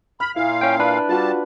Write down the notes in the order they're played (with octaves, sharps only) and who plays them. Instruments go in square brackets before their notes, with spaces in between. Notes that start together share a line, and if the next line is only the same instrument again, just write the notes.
[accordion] B5 [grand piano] F6
[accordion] A#2 F5 [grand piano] E4
[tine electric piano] C#4 G5
D4 B4
[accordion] G3 A5 [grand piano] F4 F#4